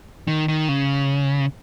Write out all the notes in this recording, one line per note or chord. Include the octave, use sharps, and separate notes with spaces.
D#3
D#3
C#3